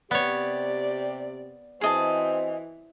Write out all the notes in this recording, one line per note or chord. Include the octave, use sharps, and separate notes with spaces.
C3 B3 G4 C#5 D5
E3 C4 F#4 G#4 C5 D#5 A5